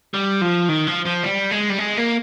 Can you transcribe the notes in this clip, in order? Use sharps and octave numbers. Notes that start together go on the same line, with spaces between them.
G3
F3
D#3
F3
F3
G3
G#3
G3
G#3
A#3